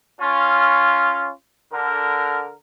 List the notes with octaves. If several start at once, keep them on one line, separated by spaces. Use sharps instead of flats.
C#4 F4
D3 A#4